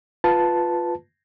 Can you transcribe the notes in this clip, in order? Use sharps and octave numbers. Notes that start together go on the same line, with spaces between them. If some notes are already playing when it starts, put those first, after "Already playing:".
F4 B4 A5